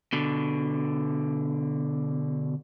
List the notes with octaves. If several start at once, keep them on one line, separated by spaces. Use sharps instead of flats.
B2 D3